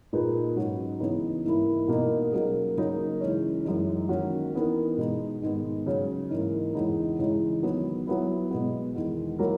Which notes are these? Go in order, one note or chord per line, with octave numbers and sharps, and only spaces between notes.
A#2 A#3 D#4 G#4 B4
G#2 F#3 C#4 F#4
C#3 E3 B3 D#4
G#2 E3 A#3 E4
B2 A#3 D#4
F#3 A#3 C#4 G#4
C#3 F#3 A#3 D#4 A#4
C#3 E3 G#3 C#4
F#2 E3 G#3 D#4
D#3 A#3 C#4 F#4
E3 B3 D#4 A#4
B2 G#3 D#4
G#2 D#3 G#3 B3
C#3 F#3 C#4
G#2 E3 A#3
E2 C#3 E3 G#3 D#4
C#3 E3 G#3 D#4
D#3 F#3 B3
F#3 B3 E4
B2 G#3 B3
E2 D#3 G#3
F#3 A#3 E4 A#4